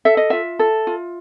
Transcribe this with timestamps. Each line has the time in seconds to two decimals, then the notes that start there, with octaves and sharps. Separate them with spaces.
0.05 A4 E5
0.17 D#5
0.30 F4 E5
0.59 A4
0.87 F4